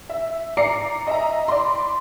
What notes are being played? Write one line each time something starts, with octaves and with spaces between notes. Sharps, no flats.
E5
D5 A#5 C7 C#7
D#5 E5 A#5
D5 B5 C6